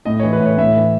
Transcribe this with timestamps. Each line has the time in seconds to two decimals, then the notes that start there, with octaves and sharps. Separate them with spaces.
0.05 A2 D#5
0.20 E3 C#5
0.33 B4
0.40 A2
0.46 C#5
0.58 A2 E5
0.76 E3